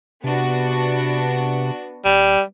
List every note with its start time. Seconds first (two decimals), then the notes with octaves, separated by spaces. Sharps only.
0.24 C3 B3 D4 F#4
2.05 D#1 G3